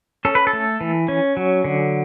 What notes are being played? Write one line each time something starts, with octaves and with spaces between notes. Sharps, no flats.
C#4 A4
B4
A4
A3
E3
C#4
F#3
D3